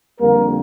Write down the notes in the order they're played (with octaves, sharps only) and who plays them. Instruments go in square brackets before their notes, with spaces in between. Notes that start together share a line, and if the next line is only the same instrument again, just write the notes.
[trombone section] F2 D3 G3 A#3 A#4